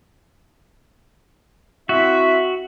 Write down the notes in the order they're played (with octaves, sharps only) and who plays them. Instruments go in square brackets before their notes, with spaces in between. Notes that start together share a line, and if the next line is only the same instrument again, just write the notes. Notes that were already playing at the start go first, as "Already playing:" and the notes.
[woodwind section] C4 E4 E5 [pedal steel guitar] F#4